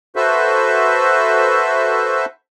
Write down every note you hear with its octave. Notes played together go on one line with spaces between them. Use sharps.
F#4 A4 B4 C5 E5